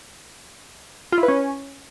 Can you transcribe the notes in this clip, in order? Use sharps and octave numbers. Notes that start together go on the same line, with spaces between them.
F4
E4
B4
C#4